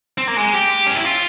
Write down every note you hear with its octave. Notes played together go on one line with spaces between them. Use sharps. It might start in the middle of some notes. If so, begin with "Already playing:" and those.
C4
A#3
G#3
G4
C#4
E4
F4